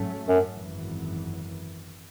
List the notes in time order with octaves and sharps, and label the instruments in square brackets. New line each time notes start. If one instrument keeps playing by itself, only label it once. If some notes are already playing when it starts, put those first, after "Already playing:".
Already playing: [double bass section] G#2 F#3 A3 C#4
[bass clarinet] F#2
[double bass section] G#1 F#2 E3